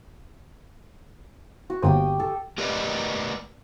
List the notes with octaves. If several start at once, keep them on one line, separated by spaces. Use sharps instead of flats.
F#4
G1 A#3 G4 C5 G5 D#6
A4
A3 G4 A#4 B4 D5 D#5